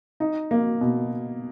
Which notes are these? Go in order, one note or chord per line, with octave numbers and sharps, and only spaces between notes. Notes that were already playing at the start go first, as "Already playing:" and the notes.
D#4
A#3
B2